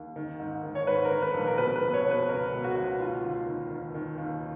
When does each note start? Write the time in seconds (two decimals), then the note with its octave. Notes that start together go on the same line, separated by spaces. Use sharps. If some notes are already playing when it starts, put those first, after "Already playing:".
Already playing: D#2
0.16 D#3
0.40 G#2
0.64 D#3
0.75 C#5
0.87 G#2 B4
1.05 A#4
1.11 D#3
1.22 B4
1.34 A#1
1.47 A#4
1.58 B2 B4
1.76 B4
1.81 B2
1.93 C#5
2.05 B2
2.11 B4
2.29 C#2 A#4
2.52 B2
2.64 F#4
2.76 C#2
2.99 D#2 F4
3.24 D#2
3.47 D#3
3.71 D#3
3.94 D#3
4.18 D#2